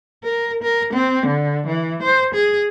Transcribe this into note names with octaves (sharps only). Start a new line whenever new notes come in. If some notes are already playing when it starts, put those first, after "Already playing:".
A#4
A#4
C4
D3
E3
C5
G#4